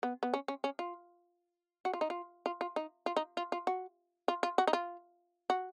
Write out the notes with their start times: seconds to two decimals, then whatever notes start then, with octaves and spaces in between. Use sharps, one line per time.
0.03 B3
0.23 B3
0.34 C#4
0.48 C#4
0.64 C#4
0.79 F4
1.85 F#4
1.94 F4
2.01 D#4
2.10 F4
2.46 F4
2.61 F4
2.76 D#4
3.06 F4
3.17 D#4
3.37 F4
3.52 F4
3.67 F#4
4.28 F4
4.43 F4
4.58 F#4
4.67 D#4
4.73 F4
5.50 F#4